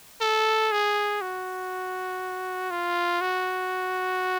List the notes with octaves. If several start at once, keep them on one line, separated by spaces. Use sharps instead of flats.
A4
G#4
F#4
F4
F#4